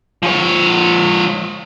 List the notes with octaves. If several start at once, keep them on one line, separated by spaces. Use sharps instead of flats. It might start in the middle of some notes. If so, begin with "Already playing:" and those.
F3 C#5